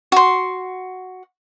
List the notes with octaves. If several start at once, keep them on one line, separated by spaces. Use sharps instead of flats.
F#4 C6